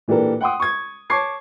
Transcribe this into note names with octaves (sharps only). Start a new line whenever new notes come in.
A#2 E3 D4 G4 A4 A#4
F#5 G5 C6 D#6
C#6 G#6
C#5 A5 C#6 D6 G#6 C7